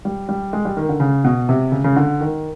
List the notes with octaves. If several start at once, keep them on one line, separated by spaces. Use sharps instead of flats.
G3
G3
G#3
G3
D#3
D3
C#3
B2
C3
C#3
C#3
D3
D#3